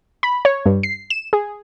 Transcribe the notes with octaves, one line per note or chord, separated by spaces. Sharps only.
B5
C#5
G2
C7
E7
G#4